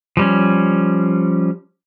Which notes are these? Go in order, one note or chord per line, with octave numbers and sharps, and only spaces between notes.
F3 G3 C#4